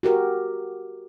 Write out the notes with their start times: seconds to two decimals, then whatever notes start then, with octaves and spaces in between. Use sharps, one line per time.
0.03 F#4 G4 A#4